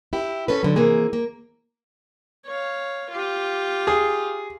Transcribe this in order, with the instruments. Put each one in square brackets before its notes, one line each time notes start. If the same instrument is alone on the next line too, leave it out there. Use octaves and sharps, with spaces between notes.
[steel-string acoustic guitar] E4 G4
C#4 A4 B4
D3 F#3
C3 E3 A#3 G#4
A#3
[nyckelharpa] C#5 F5
F4 G4
[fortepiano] G#4